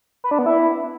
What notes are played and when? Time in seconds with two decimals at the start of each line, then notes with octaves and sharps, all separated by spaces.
0.24 B4
0.31 D4
0.39 B3
0.46 E4